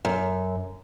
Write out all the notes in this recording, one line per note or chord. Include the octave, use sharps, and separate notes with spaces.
F#2